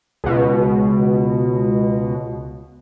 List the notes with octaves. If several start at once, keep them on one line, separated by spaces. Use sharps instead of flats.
C#2 B2